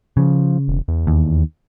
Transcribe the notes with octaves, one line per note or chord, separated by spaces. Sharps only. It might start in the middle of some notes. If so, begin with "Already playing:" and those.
C#3 F3
E1
E2
D#2